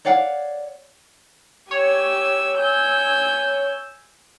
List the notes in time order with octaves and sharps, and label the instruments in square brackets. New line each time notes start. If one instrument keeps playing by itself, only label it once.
[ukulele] C#5 D5 F5 F#5
[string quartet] G4 G#5 E6 [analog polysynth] C#5
[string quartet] G#5 E6 G6